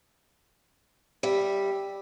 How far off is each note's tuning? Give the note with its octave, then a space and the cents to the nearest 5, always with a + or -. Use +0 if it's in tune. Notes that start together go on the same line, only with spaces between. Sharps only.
G3 +5 E5 +0